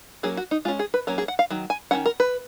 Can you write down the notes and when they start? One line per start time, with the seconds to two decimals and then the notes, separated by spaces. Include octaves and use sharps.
0.23 F#3 A#3 C#4 G#4
0.37 F#4
0.51 D#4
0.65 G#3 F4
0.68 C#4
0.79 G#4
0.94 B4
1.07 F#3 A#3 C#4 A#4
1.18 G#4
1.28 F#5
1.39 F5
1.50 D#3 F#3
1.70 G#5
1.91 D#3 A#3 C#4 F#5
2.06 A#4
2.20 B4